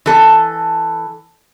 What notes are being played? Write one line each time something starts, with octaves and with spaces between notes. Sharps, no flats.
E3 A4